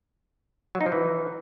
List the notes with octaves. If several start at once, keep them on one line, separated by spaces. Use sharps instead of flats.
F#3
D#4
F3
E3